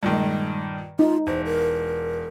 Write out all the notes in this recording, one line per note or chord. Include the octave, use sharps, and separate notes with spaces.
G2 A#2 D#3 G#3
D#4 F4
E1 C5
A#4